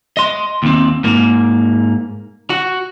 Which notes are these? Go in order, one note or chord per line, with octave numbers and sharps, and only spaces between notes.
D#5 C6
D#2 C4
G#2 A#3
F#4